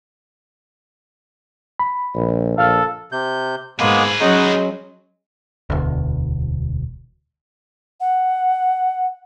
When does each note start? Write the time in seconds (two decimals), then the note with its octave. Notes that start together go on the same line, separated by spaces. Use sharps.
1.79 B5
2.15 A#1
2.58 A#1 A4 F5 F6
3.12 C3 G6
3.79 G#2 G#3 A#3 B3 G#4 B4
4.20 F#3 G#3 C#4 D#4 F#4
5.70 E1 D2
8.01 F#5